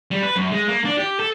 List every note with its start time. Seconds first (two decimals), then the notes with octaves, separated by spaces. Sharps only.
0.11 G3
0.23 B4
0.36 F#2
0.52 G#3
0.68 A#3
0.85 D4
0.98 G4
1.20 A4